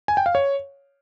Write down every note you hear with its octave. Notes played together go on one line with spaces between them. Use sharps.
G#5
G5
F5
C#5